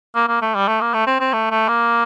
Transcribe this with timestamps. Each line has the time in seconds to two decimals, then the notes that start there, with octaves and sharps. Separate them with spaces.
0.16 A#3
0.28 A#3
0.42 A3
0.55 G3
0.68 A3
0.81 A#3
0.94 A3
1.07 C4
1.20 C4
1.33 A3
1.51 A3
1.68 A#3